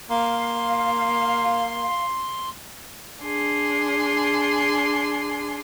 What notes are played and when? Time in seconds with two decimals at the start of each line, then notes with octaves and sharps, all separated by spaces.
0.10 A#3 F5 C6
3.23 D4 G#4 C6